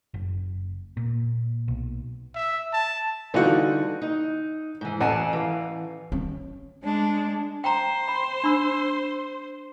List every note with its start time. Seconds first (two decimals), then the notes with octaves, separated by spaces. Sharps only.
0.14 F#1
0.97 A#2
1.68 B1
2.35 E5
2.73 A5
3.34 D3 E3 G3 D#4 F4 F#4
4.02 D#4
4.81 G#2 E3
5.00 A1 F#5 G#5 A5
5.33 E3 F5
6.12 C#4
6.83 G#3 D4
7.64 C5 G5 A#5
8.08 B5
8.44 D4 B5 E6